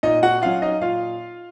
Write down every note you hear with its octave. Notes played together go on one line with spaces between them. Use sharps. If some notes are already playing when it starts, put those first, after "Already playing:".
A#2 D#4 D#5
F#4 F#5
F#3 C#4 F4 F5
D#4 D#5
A#2 F4 F5